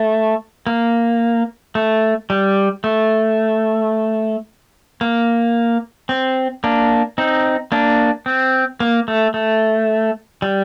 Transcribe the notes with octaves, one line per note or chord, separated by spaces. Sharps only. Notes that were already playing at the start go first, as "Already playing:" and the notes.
Already playing: A3
A#3
A3
G3
A3
A#3
C4
A#3 D4
C4 D#4
A#3 D4
C4
A#3
A3
A3
G3